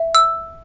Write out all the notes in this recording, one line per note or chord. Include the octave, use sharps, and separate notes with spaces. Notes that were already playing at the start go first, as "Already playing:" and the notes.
Already playing: E5
E6